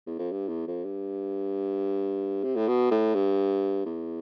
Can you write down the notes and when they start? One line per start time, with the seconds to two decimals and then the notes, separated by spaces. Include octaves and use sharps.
0.07 E2
0.19 F2
0.32 G2
0.48 E2
0.67 F2
0.85 G2
2.44 C3
2.56 A2
2.68 B2
2.91 A2
3.15 G2
3.85 E2